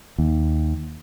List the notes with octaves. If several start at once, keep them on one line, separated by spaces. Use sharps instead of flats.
D#2